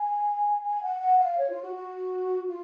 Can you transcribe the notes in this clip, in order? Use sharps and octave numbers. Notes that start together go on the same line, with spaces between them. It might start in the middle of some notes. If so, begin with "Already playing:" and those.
Already playing: G#5
G#5
F#5
F#5
F5
C#5
F4
F#4
F#4
F4